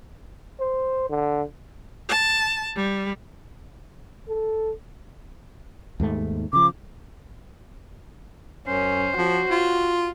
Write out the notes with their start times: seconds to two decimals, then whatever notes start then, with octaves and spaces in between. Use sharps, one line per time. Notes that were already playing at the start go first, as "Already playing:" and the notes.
0.60 C5
1.10 D3
2.09 A5
2.76 G3
4.28 A4
6.00 D#2 G#2 A3
6.53 C#3 F3 D6
8.68 F#2 C#4 C5
9.18 F3 F#4
9.50 F4